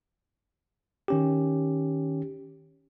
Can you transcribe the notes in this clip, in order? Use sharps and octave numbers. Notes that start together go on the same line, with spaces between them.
D#3 C#4 G4